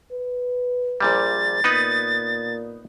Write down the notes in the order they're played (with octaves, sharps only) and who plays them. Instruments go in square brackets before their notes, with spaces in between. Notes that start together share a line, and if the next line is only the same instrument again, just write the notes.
[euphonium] B4
[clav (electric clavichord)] A#1 A#2 G3 [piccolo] A6
[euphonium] A#2 [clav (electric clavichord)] B3 D#4 B4